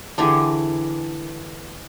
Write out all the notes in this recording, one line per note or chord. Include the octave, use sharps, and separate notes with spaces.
D3 E3 G4 G#4